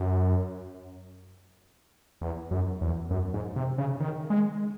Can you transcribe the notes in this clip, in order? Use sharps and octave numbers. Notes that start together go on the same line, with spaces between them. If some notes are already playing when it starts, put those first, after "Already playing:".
Already playing: F#2
E2
F#2
E2
F#2
G#2
C3
C#3
D#3
G#3